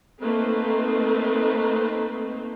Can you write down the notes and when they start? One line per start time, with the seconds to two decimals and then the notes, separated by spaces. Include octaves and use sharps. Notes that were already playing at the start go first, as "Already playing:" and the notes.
0.20 A3 A#3 C4 D#4 B4 C5